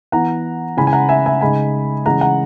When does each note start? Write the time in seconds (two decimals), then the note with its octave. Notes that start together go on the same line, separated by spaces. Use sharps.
0.12 E3 B3 E4 F#5 A#5
0.77 C#3 G#3 C#4 E4 G#5 B5
0.87 G#5
0.93 F#5 A#5
1.09 E5 G#5
1.26 E5 G#5
1.41 C#3 G#3 D#4 G#5 B5
2.06 C#3 E3 G#3 C#4 F#5 A#5
2.21 F#5 A#5